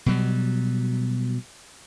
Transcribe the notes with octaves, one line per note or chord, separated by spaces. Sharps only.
B2 F#3 G3